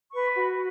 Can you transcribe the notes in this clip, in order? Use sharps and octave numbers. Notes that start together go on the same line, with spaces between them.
B4 C#6
F#4